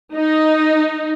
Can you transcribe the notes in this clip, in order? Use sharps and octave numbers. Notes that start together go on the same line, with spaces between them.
D#4